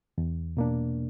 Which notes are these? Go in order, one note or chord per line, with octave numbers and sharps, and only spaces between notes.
E2
B2 A#3 D4